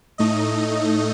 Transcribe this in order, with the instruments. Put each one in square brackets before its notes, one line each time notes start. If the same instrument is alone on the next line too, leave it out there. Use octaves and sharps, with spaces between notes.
[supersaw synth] A2 A3 D#4 D#5